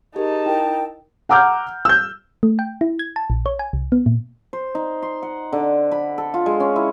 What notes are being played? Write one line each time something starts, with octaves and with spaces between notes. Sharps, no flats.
D#4 G4 G#4 A#4 A5
E4 A#4 G5
F#5 A#5 D6 E6 F6 G6
E6 G6
A3
G5
E4
G#6
A5
A#1
C#5
G#5
C2
B3
A#2
C5
D#4
C6
F#5
D3
B5
A4
F4
G#3
C#4
E4